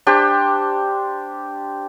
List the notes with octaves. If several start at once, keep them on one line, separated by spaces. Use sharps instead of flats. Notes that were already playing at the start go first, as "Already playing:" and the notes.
D4 G4 C5